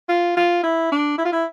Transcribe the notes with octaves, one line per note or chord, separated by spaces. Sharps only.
F4
F4
E4
D4
E4
F4
E4